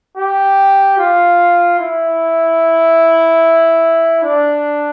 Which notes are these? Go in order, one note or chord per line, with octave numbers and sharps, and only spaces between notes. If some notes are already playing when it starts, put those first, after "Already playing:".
G4
F4
E4
D4